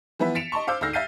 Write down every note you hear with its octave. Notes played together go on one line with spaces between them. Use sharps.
E3 F3 B3 B4 E5
A6 B6 C#7 D7 E7 F7
D#5 A5 C6 C#6
C5 F5 D6 E6 G6
D2 G#2 E6 F6 A#6 C7
E5 F5 G6 A6 C7 D#7